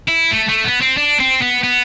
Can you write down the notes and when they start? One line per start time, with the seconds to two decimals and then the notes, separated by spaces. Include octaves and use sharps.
0.09 E4
0.31 A3
0.48 A3
0.64 B3
0.81 C4
0.97 D4
1.20 C4
1.42 B3
1.64 B3